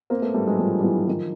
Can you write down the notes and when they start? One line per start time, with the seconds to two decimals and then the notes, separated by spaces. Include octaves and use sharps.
0.10 A#3 C4
0.22 A3 B3
0.34 G3 A3
0.47 F#3 G#3
0.59 F3 G3
0.79 G3
0.83 E3 F#3
1.07 D#3 F3